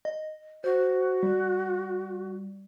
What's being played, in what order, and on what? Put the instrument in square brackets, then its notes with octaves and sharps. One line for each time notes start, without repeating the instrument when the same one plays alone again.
[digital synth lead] D#5
[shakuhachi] F#4 [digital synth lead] C5
[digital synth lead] G3